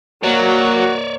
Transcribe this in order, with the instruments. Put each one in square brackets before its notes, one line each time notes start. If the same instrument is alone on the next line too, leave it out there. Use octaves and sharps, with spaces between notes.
[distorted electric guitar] F#3 [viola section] A#3 [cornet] F#4 [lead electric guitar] C#5 D5